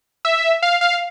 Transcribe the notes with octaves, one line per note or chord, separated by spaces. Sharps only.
E5
F5
F5